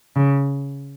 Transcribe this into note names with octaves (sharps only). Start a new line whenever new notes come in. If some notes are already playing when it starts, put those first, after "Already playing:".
C#3